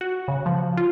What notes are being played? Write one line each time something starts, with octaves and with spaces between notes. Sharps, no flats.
F#4
C#3
F3
F4